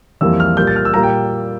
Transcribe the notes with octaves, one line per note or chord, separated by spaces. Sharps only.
F2 E3 G3 A#3 E6
F6
A#2 G3 A#3 G6
A6
F6
E6
A#2 G3 A#3 A#5
G5